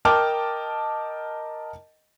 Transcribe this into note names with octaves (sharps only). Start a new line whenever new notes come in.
A#4 D#5 G5 A5 D6 F6